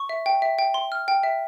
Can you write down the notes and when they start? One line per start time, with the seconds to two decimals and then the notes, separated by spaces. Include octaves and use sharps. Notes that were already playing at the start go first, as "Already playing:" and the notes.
Already playing: C#6
0.09 E5
0.26 G5
0.42 E5
0.59 G5
0.74 C6
0.92 F6
1.08 G5
1.23 E5